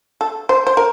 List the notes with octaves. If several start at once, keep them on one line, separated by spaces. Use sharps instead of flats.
A4
C5
C5
A#4